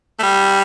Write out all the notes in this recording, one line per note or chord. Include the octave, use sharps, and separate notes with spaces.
A3
G3